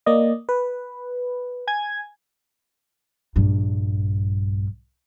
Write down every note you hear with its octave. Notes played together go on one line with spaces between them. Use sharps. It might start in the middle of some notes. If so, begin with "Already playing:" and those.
A#3 D5 D#5
B4
G#5 G#6
A#1 G2